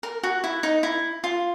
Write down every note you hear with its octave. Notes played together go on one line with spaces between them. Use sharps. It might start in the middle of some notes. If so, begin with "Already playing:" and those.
A#4
F#4
E4
D#4
E4
F4